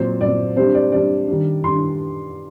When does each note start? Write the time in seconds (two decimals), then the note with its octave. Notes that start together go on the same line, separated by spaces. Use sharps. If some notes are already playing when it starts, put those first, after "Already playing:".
Already playing: A#2 F#3 C4 C5
0.21 A#2 F#3 C4 D5
0.56 C3 G3 D4 C5
0.74 D5
0.92 C3 G3 D4 D5
1.28 D#3 G3 D4
1.64 D#3 G3 D4 C6